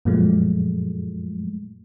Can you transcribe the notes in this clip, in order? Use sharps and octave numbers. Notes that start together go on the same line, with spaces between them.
F#2 A#2 F3 F#3 G#3 A3